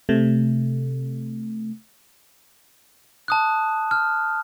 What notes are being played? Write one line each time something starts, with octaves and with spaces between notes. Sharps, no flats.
C3 A3
A5 D#6 F#6
F6